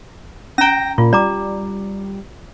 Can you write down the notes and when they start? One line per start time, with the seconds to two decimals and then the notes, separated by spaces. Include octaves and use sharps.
0.58 C#4 G5 A#5 A#6
0.98 A#2 F4
1.13 G3 D5 A#5 D6